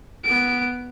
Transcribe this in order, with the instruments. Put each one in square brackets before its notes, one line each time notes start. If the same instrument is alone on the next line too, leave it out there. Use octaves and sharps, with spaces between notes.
[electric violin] B3 D7